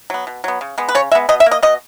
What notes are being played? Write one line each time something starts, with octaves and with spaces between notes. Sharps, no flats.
F#3 B3
B2
F#3 B3
C#3
G#3 B3
B4
C#3 C#5
G#3 B3 E5
B2 D#5
E5
A#3
D#5
B2 D#5